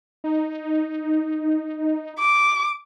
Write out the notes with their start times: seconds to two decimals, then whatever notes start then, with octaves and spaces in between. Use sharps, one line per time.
0.24 D#4
2.19 D6